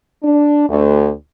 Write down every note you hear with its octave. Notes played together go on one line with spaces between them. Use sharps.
D4
D2